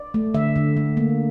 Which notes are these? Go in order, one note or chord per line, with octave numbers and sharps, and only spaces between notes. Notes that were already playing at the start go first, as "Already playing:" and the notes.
Already playing: D5
A3
D3 E5
D3
A3
A#3